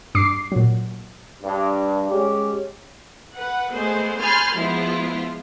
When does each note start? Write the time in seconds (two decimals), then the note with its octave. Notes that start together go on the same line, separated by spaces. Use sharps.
0.15 G2 D6 C7
0.52 A#2 F#3
1.43 G2
2.12 G#3 C#4 G4
3.35 B4 F#5
3.72 G#3 A3 B3 C5
4.21 G#5 B5 C6 F6 G6 A6
4.55 F3 G#3 B3 E4 F4